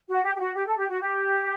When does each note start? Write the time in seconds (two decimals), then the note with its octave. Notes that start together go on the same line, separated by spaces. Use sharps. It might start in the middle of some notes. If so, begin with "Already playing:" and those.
0.09 F#4
0.24 G4
0.35 G4
0.39 F#4
0.55 G4
0.66 A4
0.77 G4
0.89 F#4
1.01 G4